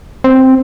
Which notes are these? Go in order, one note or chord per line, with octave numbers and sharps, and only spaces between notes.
C4